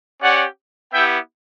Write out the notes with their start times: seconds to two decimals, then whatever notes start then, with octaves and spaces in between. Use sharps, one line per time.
0.21 C#4 G4 D5 F#5
0.93 B3 E4 G4 E5 G5